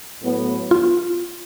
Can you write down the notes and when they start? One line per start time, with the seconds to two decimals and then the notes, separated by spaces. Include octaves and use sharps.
0.22 A2 F#3 B3
0.71 F4